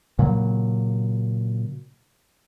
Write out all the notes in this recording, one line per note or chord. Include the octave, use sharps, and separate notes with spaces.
A#2 C#3 F#3